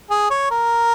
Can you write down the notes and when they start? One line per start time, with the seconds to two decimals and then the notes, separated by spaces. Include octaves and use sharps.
0.10 G#4
0.31 C#5
0.51 A#4